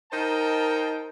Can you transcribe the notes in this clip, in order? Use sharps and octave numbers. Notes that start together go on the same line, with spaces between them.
D#4 A#4 C5 D#5 G5 A5